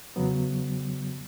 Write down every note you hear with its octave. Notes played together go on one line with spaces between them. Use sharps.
E2 C#3 F#3 B3